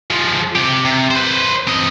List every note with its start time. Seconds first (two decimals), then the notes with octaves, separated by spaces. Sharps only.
0.11 F3 G#3
0.56 C3 G4
0.85 C3
1.11 B4 C5
1.67 C4 D#5